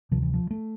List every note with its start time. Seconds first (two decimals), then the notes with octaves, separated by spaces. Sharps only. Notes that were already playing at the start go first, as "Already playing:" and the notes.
0.11 D2 C3 F3
0.22 E3
0.34 F3
0.51 A3